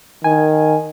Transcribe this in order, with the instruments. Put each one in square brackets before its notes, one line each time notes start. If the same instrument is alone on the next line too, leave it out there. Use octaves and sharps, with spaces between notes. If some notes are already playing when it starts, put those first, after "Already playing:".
[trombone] D#3 [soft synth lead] G#5